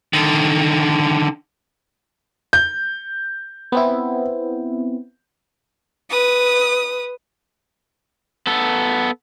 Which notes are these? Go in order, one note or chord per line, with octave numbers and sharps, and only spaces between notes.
D3 D#3
G6
B3 C4 E4
B4 D#6
B3 A4